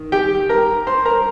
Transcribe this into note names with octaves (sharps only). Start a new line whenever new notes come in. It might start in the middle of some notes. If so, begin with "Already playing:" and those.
Already playing: D#3
G4 G5
A#4 A#5
C5 C6
A#4 A#5